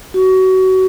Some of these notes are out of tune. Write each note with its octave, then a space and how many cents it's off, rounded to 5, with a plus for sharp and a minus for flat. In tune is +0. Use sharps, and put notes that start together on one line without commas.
F#4 +25